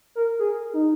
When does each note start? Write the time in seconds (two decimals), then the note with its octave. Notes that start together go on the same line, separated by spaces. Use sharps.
0.15 A#4
0.39 G#4
0.74 D#4